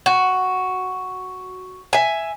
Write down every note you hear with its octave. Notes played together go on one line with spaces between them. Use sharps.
F#4
E5 G#5